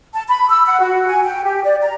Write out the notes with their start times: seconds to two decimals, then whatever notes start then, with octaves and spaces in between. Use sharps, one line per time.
0.14 A5
0.28 B5
0.50 E6
0.66 F#5
0.81 F#4
1.08 G#5
1.24 G5
1.44 G4
1.64 D5
1.82 A#5